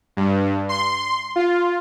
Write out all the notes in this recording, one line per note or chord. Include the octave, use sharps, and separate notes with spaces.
G2
C6
F4